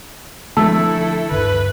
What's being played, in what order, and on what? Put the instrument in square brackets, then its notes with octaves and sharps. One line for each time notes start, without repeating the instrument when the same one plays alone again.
[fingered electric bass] D3 F3 D4 [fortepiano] A3 [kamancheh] E4 A4 [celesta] A5 E6
[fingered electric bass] D2 G2 D3 [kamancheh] B4